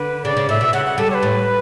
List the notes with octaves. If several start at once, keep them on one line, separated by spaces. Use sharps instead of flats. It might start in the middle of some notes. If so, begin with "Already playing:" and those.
Already playing: D3 B4
C#3 D5
C#3
A2 E5
B2
C#3 F#5
F#5
G3 A4
C#5
B4
A2